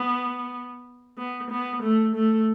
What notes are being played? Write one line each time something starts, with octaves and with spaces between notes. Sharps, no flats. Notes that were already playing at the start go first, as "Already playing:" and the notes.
Already playing: B3
B3
B3
A3
A3